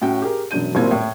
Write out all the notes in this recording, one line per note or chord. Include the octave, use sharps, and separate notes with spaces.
A2 C#4 F#4 G5
G4 G#4 A#4
E1 F#2 D4 G6 D#7
F#1 D#2 A#2 C4 E4 G#6
A2